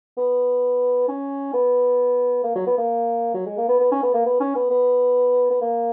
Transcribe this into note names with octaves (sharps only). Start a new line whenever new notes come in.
B3
C#4
B3
A#3
F#3
B3
A#3
F#3
G#3
A#3
B3
B3
C#4
B3
A#3
B3
C#4
B3
B3
B3
A#3